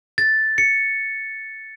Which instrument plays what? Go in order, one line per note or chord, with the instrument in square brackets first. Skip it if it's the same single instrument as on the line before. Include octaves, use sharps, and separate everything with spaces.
[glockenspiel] A6
C#7